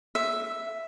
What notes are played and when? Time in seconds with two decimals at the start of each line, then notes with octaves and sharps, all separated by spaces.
0.15 E5